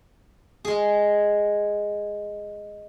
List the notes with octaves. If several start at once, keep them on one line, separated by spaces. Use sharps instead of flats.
G#3 G#4